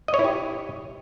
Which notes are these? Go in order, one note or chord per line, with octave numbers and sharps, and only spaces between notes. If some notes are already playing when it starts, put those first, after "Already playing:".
D#5
C#5
E4
G4